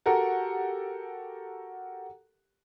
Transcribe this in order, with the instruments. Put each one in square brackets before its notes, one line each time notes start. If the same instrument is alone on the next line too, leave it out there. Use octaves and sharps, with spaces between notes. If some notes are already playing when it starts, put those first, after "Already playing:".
[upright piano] F#4 G4 A4 A#4 F#5